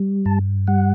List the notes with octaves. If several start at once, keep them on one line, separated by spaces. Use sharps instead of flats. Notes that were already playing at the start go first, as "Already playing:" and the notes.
Already playing: G3
G2 A5
G3 F#5